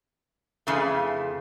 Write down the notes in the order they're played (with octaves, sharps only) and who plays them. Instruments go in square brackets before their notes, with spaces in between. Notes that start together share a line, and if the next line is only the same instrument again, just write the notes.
[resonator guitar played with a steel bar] F2 C#3 E3 A3